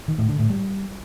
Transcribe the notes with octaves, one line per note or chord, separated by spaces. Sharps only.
D#3
A2
D3
A2
G3